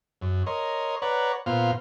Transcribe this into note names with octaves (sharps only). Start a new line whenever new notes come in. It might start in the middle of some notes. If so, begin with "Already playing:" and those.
F#2
A#4 C#5 D#5 C6
B4 C#5 D5 F#5 A#5
A#2 B3 F4 C5 F5